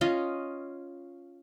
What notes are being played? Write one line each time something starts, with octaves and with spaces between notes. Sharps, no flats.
C#4 F4 D#5